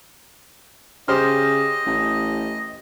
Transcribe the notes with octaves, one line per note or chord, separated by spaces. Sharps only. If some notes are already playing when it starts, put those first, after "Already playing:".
C#3 G4 C5 D#5 F6
A1